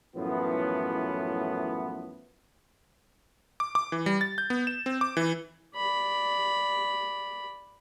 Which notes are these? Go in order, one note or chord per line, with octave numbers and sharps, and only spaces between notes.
F#2 A2 E3 F3 A3 B3
D6
D6
E3
G3
A6
G6
B3
E7
C4
D6
E3
D5 B5